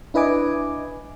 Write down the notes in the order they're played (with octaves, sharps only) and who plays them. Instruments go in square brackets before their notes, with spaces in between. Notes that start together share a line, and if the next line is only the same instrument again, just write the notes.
[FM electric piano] D4 E4 B4 D#5 G#5 D6